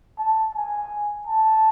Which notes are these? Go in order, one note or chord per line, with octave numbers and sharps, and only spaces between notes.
A5
G#5
A5